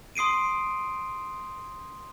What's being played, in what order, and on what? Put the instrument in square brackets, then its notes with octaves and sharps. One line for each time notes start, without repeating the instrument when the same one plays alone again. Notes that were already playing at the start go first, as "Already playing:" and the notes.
[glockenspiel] C6 D#6 C7 D7 D#7